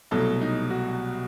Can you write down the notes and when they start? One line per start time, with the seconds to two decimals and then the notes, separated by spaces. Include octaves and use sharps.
0.11 C2 B2 F#3 A3 A4
0.41 D#4
0.70 F#4